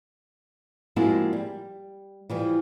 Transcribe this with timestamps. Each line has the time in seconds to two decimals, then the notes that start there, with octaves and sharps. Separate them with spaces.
0.96 F3 G#3 A#3 C4 E4 F#4
1.33 G3
2.30 E3 F3 G3